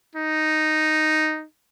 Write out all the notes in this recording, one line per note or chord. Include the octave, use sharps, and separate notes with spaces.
D#4